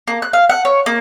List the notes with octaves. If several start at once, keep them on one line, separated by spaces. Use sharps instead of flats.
A#3
F#6
F5
F#5
C#5
A#3